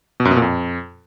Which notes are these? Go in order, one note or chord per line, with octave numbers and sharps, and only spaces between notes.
B2
F#2
B2
A#2
F2